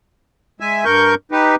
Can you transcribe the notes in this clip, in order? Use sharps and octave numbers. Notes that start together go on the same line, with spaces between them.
G#3 E5 G#5
G2 A#4 C#6 G6
D#4 G4 B4